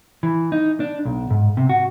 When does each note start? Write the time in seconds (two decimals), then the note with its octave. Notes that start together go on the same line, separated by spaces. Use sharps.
0.23 E3
0.52 D#4
0.80 D4
1.05 B1
1.30 G#2
1.57 C3
1.69 F#4